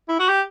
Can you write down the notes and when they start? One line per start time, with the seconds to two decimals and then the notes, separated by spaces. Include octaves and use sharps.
0.09 E4
0.20 F#4
0.29 G4